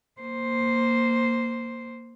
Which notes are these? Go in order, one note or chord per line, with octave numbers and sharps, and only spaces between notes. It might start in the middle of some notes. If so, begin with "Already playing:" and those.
A#3 C5